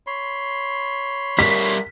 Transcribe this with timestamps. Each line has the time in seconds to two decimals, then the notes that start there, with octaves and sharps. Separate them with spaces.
0.07 C#5 B5 C6
1.39 G3 A#4 B6